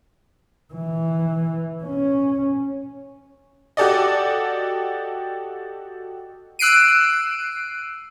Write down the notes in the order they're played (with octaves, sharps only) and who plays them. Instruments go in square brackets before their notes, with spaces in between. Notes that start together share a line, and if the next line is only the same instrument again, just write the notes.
[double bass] E3
C#4
[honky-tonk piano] F#4 G4 A4 D5 D#5
[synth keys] E6 F#6 C7 D7 D#7